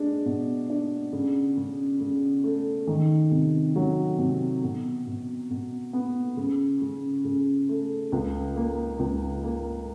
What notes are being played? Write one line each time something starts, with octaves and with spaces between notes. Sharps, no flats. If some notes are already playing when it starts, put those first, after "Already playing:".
Already playing: G#3 D4
B2
D4
C#3
C#3
C#3
A3
D#3
C3
F#3
C3
B2
B2
B2
B3
C#3
C#3
C#3
A3
C#2
A#3
C#2
A#3